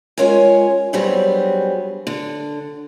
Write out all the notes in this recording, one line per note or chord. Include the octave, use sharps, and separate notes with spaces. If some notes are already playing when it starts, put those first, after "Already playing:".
G#3 C#4 F4 A#4 C#5 G#5
G2 F#3 G3 B3 C4 G#4
D3